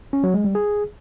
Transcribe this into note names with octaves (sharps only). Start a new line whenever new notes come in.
C#4
F#3
G#3
G3
G#4